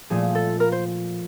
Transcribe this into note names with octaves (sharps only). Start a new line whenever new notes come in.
A#2 F3 A3 G#4
A4
A#4
C5